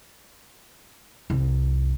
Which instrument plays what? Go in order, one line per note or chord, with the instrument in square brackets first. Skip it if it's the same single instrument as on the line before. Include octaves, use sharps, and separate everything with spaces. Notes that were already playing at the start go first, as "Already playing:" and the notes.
[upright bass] C2 F2